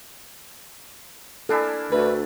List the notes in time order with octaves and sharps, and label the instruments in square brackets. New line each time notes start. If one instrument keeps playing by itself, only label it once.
[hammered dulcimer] A#3 D4 E4 [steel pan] A4 G#5
[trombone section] D2 [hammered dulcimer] A3 [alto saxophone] B4